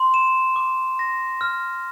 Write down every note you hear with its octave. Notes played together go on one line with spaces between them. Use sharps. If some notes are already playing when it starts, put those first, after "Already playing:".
Already playing: C6
E7
D6
A#6
F6